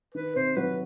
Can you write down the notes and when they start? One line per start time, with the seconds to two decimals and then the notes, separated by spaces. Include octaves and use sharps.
0.14 D#3 B4
0.35 C3 C5
0.56 F#3 B4